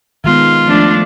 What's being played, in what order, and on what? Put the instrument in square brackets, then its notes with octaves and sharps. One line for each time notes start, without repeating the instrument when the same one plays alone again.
[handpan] D#3 G#3 B3 [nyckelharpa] F4
[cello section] F3 A3 D4